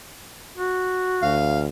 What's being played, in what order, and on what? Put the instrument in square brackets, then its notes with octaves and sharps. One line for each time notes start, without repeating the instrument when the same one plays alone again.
[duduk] F#4
[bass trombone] D2 [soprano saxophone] F5